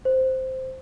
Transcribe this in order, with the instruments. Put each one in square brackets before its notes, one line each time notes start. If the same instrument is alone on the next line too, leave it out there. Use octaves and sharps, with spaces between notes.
[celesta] C5